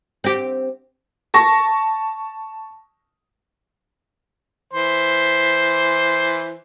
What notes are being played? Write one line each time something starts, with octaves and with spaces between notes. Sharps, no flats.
C4 G4
A5 C#6 A#6
E3 C5